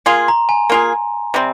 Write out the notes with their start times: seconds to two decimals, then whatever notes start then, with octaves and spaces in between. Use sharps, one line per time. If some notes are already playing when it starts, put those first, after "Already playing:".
0.06 A#3 F4 G#4 C6
0.28 A#5
0.49 G#5
0.70 A#3 F4 G#4
1.34 C3 G3 C4